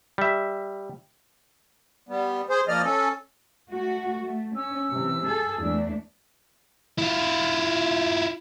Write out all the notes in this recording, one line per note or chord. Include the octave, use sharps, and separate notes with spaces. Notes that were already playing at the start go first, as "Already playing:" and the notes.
G3 E5
G3 B3
G#4 C5
F3 A#3 D5 D#5 F6
C#4 A4
A3 F#4
A3
C#4 E6
C3 E3
G#4 A4
E2 A3 D4
E4 F4